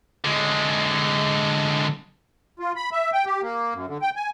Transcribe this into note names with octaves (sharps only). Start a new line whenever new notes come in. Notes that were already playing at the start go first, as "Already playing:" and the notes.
D3 G#3
F4
B5
E5
G5
G4
A#3
F#2
D3
G5
G#5